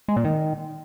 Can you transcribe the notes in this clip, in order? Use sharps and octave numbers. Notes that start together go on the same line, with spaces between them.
G#3
A#2
D#3